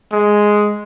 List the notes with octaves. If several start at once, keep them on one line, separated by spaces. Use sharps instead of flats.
G#3